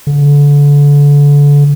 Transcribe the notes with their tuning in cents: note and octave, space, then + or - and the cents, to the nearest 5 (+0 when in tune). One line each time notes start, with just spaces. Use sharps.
D3 -30